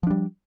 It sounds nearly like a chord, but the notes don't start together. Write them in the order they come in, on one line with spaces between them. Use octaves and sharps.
F3 D4 G3